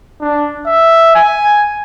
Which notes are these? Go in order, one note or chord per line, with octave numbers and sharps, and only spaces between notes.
D4
E5
G#5